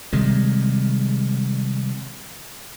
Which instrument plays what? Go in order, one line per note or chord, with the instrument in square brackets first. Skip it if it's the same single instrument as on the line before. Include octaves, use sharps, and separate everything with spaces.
[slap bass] C3 D#3 G3 G#3